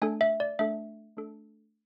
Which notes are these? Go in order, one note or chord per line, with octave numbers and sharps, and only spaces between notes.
A3 D4 A4 G#5
E5
D5
A3 D4 A4 E5
A3 D4 A4